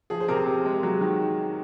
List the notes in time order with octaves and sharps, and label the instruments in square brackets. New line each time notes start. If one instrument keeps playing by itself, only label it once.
[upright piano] F3 [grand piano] G#4
[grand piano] C5
[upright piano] C3 [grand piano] A#4
[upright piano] C3
G#3
F#3
D#3